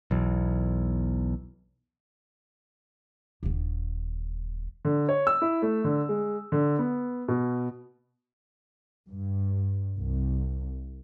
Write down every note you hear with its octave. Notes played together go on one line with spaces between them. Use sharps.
B1 E2
D#1 D3
D3
C#5
E6
E4
A3
D3
G#3
D3
B3
B2
G2
C2